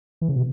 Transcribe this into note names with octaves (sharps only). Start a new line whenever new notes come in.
E3
C#3
B2